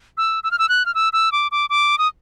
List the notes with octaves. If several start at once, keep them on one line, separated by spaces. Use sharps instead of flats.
E6
E6
F6
E6
F#6
F6
E6
E6
D6
D6
D6
D#6